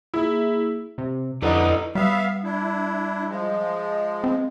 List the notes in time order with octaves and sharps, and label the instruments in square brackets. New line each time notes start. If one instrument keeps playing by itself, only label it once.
[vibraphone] A#3 G#4 [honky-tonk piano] E4
[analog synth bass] C3
[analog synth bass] F2 [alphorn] D3 [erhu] D#4 [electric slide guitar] E4 A4 B4
[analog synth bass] G3 [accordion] B3 E5 F5
[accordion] D4 E4
F3 G#3
[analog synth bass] C4